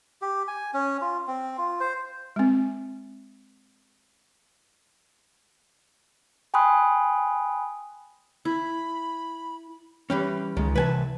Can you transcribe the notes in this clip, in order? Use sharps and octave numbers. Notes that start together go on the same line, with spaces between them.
G4
G#5
C#4
F4
C4
F4
C5
G#3 C4
G5 G#5 B5 C6 D#6 F#6
E4 B5
E3 G3 C#4
C#2 D#3 G#3
C3 E3 B4 G#5 A5